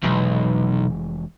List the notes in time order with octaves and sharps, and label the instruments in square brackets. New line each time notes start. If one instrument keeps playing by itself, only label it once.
[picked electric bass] F1 E3 G#3 [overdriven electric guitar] B1